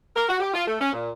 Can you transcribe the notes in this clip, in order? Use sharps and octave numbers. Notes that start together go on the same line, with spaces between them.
A#4
F#4
G4
F4
A3
C#4
A#2